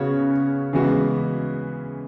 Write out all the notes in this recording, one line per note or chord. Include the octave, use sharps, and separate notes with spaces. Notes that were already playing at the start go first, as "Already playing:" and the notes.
Already playing: C#3 B3 F#4 C#5
C#3 E3 G#3 B3 F#4